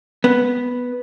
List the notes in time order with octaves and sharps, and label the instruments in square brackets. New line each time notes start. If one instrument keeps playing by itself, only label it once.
[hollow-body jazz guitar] B3